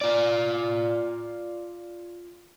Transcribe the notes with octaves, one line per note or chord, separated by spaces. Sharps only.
F4 D5